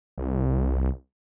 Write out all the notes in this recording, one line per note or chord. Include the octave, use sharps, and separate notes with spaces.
C2